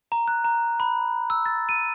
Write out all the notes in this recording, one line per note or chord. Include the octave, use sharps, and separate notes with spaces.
A#5
F#6
A#5
B5
E6
A6
D#7